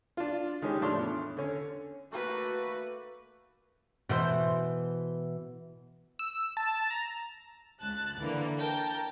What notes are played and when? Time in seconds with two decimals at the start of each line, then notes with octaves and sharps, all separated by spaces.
0.17 D4 F4
0.62 D#3 G#3 C#4 G4
0.81 A2 F3 D4 C#5 C6 F6
0.98 E2
1.37 D3 C#4
2.12 A3 A#3 F#4 B4
4.09 B2 E3 C5
6.19 E6
6.57 A5
6.91 A#5
7.81 C#2 A5 F#6
8.19 D3 E3 A#3
8.56 A#4 G5 A5